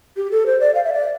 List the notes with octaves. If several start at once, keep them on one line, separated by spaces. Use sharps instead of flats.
G4
A4
C5
D5
F5
E5
D5